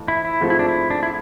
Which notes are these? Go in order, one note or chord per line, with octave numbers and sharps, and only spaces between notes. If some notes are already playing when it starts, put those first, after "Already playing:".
Already playing: F2 E3 A3
E4
E4
G#2 F3 A3 C4 F4
E4
D4
E4
D4
E4